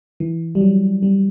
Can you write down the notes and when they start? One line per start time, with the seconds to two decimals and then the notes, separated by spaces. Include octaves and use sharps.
0.20 E3
0.55 G3
0.61 F#3
1.03 G3